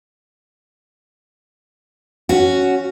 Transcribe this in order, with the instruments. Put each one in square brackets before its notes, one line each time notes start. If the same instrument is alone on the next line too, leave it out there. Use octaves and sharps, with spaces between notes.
[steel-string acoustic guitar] C#4 F#4